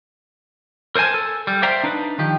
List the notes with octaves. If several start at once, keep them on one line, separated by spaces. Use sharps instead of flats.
A#4 C5 D5 G#5 A5
A4
G3
C5 D5 E5 F5 G5 A#5
D4 D#4 B4
D#3 F3 G4